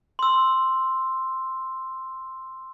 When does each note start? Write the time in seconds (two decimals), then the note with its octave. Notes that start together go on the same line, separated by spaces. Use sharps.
0.19 C6 E6